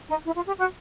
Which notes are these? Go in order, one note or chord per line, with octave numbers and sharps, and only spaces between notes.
D#4
E4
F4
G4
F#4